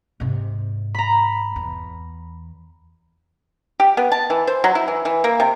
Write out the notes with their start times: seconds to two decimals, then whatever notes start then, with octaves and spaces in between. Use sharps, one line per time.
0.20 G#2 C3
0.95 A#5 B5
1.56 E2
3.80 G4
3.97 B3
4.12 A5
4.30 E3
4.47 C5
4.64 F#3
4.75 E4
4.88 E3
5.05 E3
5.24 A#3
5.40 C3